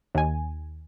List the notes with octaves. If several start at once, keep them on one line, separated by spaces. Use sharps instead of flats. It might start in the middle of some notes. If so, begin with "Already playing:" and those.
D#2 G#5